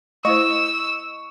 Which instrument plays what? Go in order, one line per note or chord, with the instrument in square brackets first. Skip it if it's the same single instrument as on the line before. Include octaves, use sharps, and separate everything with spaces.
[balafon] A3 E4 C5 [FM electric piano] D#5 [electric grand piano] C#6 [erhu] E6